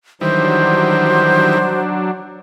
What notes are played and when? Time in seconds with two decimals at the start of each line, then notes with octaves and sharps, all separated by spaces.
0.21 D#3 E3 F#3 G3 D4 C5